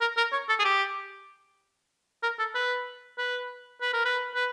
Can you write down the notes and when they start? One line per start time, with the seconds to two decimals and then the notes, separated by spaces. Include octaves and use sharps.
0.01 A#4
0.17 A#4
0.32 C#5
0.49 A4
0.59 G#4
0.65 G4
2.23 A#4
2.39 A4
2.55 B4
3.18 B4
3.81 B4
3.93 A#4
4.05 B4
4.35 B4